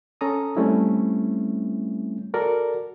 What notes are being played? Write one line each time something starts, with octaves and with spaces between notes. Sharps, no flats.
C#4 A4 A#5 D#6
G3 A3 C4 C#4 E4
F#4 A4 A#4 D5